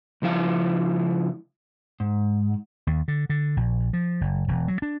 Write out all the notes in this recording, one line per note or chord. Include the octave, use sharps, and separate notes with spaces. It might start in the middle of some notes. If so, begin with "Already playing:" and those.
C#2 F3 E4 F5
G#2
D#2
D3
D3
A#1
F3
F#1
E1
F#3
D4